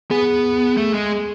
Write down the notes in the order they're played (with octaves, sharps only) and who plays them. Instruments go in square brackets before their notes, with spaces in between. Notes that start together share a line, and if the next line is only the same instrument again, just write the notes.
[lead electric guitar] B3 [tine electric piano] G#4
[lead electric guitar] A3
G#3